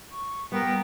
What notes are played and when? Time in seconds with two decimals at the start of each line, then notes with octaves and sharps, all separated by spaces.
0.11 C#6
0.52 G3 B3 A#4 G5